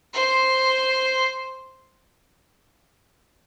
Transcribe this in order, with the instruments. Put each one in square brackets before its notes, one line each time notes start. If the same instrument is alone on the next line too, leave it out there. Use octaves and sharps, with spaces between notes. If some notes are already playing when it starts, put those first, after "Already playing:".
[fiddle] C5